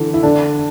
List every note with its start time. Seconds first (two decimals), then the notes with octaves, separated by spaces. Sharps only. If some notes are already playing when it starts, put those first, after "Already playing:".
Already playing: D3 E3
0.14 E4
0.23 D3 D4